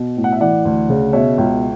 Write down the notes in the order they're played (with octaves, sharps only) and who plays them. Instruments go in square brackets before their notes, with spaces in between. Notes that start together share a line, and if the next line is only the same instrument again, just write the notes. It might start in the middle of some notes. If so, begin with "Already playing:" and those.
Already playing: [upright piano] B2
A2
F#5
E5
E3 D5 F#5
D2
C#3
B2 C#5 E5
C#2